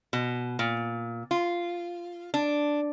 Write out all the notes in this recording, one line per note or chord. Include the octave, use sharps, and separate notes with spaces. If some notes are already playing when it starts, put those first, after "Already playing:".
B2
A#2
F4
D4